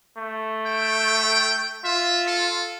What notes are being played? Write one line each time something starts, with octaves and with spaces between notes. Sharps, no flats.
A3
G5
F4 E5
A4